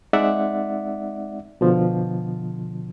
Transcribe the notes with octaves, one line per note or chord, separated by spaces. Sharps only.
G#3 C4 D#4 D5 E5 F#5
B2 D3 F3